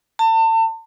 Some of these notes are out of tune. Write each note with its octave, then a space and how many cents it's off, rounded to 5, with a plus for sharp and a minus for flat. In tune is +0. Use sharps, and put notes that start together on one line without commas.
A5 +35